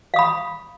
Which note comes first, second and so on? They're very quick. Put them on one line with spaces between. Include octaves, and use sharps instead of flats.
F5 D#6 B5